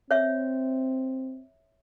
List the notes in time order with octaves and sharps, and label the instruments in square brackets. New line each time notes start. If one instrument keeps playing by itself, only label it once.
[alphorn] C4 [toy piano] C#5 E5